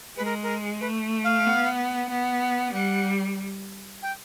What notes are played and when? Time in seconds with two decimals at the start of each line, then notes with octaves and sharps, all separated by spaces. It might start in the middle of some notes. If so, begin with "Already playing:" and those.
0.17 G#3 B4
0.25 A#4
0.43 A#4
0.81 A3 B4
1.24 F5
1.46 B3
2.10 B3
2.73 G3 F#5
4.02 G5